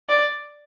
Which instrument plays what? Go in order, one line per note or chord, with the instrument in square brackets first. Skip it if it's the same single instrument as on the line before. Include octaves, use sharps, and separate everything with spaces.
[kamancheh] D5